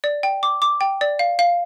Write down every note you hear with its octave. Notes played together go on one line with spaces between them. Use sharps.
D5
G5
D6
D6
G5
D5
F5
F5